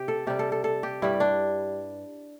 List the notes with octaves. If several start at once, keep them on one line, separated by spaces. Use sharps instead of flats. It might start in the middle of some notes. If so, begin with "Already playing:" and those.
Already playing: C3 G4
A4
C3 G3 G4
A4
A4
A4
G4
G2 G3 E4
D4